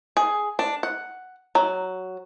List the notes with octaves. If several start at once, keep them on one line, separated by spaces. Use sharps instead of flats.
G#4
D4
F#5
F#3